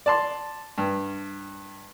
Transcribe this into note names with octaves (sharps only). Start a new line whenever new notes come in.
D5 A5 C6
G2